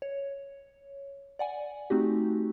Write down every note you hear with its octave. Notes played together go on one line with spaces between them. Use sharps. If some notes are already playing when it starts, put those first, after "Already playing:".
C#5
D5 F#5 G#5
A3 C4 D#4 F#4 G4